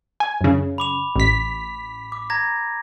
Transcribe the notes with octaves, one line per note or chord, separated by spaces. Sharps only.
G#5
F#2 C#3
B5 D6 F7
A1 B6
D6
A#5 G#6 A#6